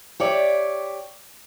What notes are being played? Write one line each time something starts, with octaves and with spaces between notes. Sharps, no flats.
G4 C#5 D5 E5